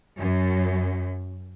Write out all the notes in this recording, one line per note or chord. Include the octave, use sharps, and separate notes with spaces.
F#2